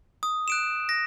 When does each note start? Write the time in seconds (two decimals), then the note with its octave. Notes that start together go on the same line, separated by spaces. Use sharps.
0.23 D#6
0.48 F#6 D7 E7
0.89 A#6